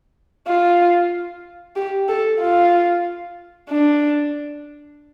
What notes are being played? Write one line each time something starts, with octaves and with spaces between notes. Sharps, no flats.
F4
G4
A4
F4
D4